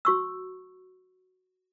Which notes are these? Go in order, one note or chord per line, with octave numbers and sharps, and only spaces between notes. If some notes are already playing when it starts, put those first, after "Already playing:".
F#4 C#6 E6